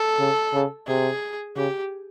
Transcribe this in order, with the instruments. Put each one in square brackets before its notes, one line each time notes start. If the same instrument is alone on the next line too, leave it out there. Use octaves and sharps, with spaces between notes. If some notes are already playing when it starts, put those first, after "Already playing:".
Already playing: [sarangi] A4
[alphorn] C#3
C#3
[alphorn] C3 [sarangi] G#4
[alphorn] C#3 [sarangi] G4